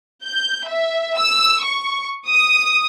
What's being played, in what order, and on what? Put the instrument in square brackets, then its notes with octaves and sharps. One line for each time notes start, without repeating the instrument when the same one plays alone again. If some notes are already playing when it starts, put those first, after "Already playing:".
[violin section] G6
E5
E6
C#6
D#6